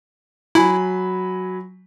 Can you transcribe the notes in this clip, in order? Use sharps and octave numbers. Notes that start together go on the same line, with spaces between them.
F#3 E4 G#5 B5